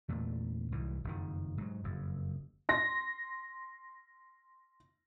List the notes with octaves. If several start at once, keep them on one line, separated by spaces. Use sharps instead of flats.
E2 A#2 A3
C2 G#2 E3
F#1 F2 D#3
G#2 F#3
F#1 F2
C6 A#6